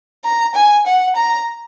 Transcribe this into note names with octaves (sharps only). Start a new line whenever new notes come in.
A#5
G#5
F#5
A#5